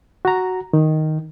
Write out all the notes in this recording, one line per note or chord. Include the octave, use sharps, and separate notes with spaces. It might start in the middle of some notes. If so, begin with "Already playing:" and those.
F#4 A#5
D#3